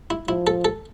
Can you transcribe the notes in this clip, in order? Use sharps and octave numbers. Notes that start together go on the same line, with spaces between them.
E4
F3 E4
A4
A4